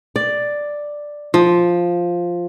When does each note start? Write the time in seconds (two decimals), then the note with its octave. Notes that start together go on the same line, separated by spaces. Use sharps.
0.16 D5
1.34 F3